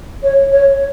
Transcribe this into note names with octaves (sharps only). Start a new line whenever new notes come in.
C#5
C#5